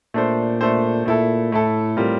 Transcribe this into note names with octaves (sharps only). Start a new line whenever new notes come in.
A#2 A3 D4 A4 C5
A3 D4 A4 C5
A#2 A3 E4 A4
A2 A3 E4 A4
G3 C4 F4 A#4